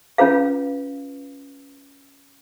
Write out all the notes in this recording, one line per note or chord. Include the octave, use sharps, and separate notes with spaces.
C#4 F4 B4 F5